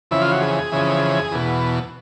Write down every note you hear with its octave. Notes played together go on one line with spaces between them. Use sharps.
F2 C#3 E3 E4
F4
F#4
G#4
F2 C#3 E3
E2 B2